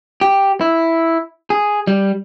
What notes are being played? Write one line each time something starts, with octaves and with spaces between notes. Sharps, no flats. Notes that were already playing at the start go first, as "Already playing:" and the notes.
G4
E4
G#4
G3